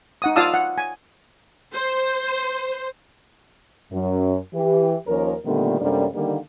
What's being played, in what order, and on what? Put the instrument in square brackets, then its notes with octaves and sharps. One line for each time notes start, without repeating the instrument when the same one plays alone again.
[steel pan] D#4 F#5 D#6
F4 D5 F5 A5 D#6 E6
F#5
G#5
[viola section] C5
[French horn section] F#2
E3 G4
D#2 F3 C#4 A#4
A#2 D3 D#3 G3 A3 B3
F#2 C3 G3 A#3 D4 A4
D3 D#3 G3 A#3